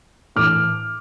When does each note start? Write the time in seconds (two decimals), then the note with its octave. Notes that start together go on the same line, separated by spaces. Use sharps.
0.36 A2 E3 D6 F6